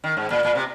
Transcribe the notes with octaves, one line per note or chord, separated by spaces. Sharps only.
D#3
G#2
A#2
A#2
C3